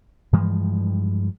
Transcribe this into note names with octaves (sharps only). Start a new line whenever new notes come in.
G2 E3 F3 G#3